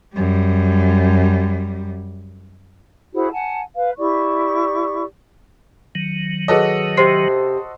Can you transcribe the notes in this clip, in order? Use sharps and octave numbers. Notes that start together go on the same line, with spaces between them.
F#2 G3
E4 F#4 G#4 C5
F#5 G#5 A5
B4 F5
E4 G4 D5 C#6
D#3 F#3
F#4 G#4 A4 B4 C#5 D#5
C3 C5 C6 C7